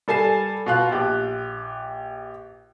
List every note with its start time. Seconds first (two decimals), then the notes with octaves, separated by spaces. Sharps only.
0.08 G3 A4 G#5 C7 E7
0.66 B2 F4 F#6
0.92 A#1 G4